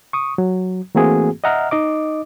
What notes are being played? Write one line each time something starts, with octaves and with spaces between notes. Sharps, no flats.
C#6 D#6
F#3
E3 A3 A#3 C4 F#4 G#4
D#5 E5 F#5 A#5 F6
D#4 D#5 D6